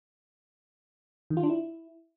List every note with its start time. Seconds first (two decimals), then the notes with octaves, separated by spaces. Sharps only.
1.30 D#3
1.37 F4
1.43 D4
1.50 E4